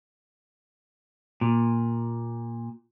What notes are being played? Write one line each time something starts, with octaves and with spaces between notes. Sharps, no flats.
A#2